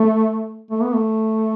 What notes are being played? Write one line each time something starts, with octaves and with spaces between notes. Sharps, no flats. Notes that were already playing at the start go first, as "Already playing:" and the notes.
Already playing: A3
A3
B3
A3